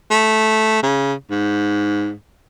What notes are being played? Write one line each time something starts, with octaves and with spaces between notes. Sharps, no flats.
A3
C#3
G#2